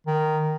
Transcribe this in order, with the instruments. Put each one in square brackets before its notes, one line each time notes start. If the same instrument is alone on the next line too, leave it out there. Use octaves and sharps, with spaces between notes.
[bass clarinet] D#3